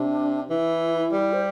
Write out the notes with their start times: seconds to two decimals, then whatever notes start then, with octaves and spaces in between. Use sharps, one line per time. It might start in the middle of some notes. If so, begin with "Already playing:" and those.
Already playing: C3 D4
0.50 E3 E4
1.12 G3
1.33 C5